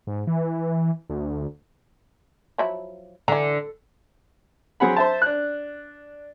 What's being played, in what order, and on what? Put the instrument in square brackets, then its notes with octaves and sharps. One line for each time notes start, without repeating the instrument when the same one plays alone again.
[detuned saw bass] G#2
E3
D2
[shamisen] F3 F#3 E4
[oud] D3 [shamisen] E3 A#5
[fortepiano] F#3 C4 G#4 F#5 B5
C5 E5 A5
D4 F#6